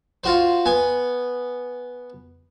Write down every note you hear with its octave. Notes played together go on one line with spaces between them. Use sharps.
F4 F#4 C5
B3 G#5